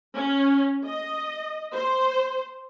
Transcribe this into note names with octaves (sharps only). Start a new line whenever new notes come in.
C#4
D#5
C5